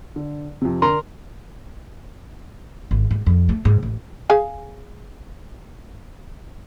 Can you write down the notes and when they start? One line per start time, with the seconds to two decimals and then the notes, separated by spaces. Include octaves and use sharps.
0.16 D3
0.61 F2 C3
0.82 D3 A#4 A#5 C6
2.91 G#1
3.11 G#2
3.26 F2
3.49 A3
3.65 G#2
3.83 A1
4.30 G#4 F5 G#5